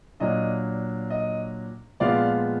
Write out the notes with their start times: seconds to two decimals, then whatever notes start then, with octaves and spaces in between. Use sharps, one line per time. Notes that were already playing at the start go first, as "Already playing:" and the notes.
0.20 A#2 F#3 D4 D#5
1.10 D#5
2.00 A#2 F3 G#3 B3 D5 F5